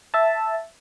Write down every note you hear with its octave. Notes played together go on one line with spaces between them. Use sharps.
E5 A5